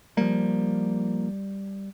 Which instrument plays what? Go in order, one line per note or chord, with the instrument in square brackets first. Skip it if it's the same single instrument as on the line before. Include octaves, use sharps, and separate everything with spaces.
[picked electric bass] F3 A#3 [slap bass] G3